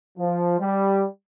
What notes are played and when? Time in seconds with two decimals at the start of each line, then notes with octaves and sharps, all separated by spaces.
0.18 F3
0.59 G3